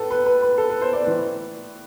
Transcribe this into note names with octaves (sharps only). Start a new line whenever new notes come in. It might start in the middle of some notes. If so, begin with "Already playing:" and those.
Already playing: A2 A4 B4
B4
B4
B4
A4
B4
C5
D5
A2 E3 B4